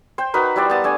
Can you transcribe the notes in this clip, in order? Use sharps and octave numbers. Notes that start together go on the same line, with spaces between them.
C5 G5
D#4 F#4 A#4 B4
G3 E4 C5 D5
B3 A5 D#6
A3 D4 G#5